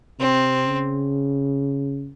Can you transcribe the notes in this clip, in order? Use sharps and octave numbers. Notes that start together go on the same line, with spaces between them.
C3 C4
C#3